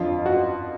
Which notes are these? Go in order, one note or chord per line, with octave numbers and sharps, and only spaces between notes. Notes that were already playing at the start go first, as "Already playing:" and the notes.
Already playing: F2 D3 F3 F4
F#4